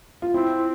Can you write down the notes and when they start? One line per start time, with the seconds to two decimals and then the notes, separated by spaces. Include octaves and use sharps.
0.22 F4
0.34 C4 E4